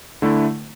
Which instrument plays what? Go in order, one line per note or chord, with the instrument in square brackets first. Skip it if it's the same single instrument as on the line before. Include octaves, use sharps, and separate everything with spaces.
[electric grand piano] D3 A3 E4